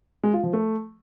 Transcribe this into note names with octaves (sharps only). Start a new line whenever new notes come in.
G#3
F4
F3
A3